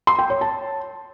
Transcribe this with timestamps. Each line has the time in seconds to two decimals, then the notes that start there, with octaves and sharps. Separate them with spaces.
0.07 C6
0.19 G5
0.30 C#5
0.41 A5